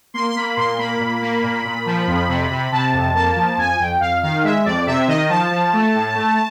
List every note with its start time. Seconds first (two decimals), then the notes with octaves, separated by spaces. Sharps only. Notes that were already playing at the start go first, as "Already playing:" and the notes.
0.14 A#3 C6
0.30 C6
0.35 A#3 B5
0.56 A#2 C6
0.79 A#3 B5
1.00 A#2
1.22 A#3
1.43 A#2
1.65 A#2
1.86 F3
2.07 F2
2.28 C3
2.50 C3
2.72 C3 A5
2.93 F2
3.14 A#3 A5
3.36 F3
3.57 F2 G#5
3.80 F2 G5
4.00 F2 F5
4.22 D#3 F5
4.44 G#3 E5
4.65 F2 D5
4.87 C3 E5
5.08 D#3 D#5
5.29 F3 A5
5.51 F3
5.73 A3
5.94 A2
6.15 A3